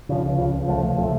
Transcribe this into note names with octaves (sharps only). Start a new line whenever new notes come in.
C#3 F3
C#2
C#3 F3
C#2
C3 F3 A3
C#2
C3 F3 A3